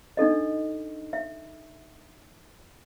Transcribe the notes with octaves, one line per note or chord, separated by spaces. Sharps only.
D4 D#4 A4 D#5
E5